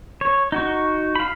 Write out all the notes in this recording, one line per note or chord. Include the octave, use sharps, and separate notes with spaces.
C#5
D#4 F#4 C#6
F5 B5